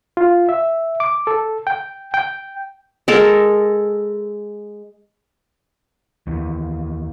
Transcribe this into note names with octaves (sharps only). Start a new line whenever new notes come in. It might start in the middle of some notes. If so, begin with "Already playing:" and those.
F4
E5
D6
A4
G5
G5
G#3 A4 A#4
D#2 E3